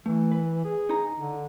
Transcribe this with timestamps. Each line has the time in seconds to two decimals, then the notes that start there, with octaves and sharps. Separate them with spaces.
0.06 E3 A3
0.32 B4
0.65 G#4
0.89 D#4 A#5
1.18 D3